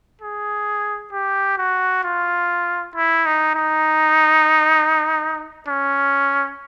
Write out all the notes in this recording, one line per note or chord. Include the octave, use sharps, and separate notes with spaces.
G#4
G4
F#4
F4
E4
D#4
D#4
C#4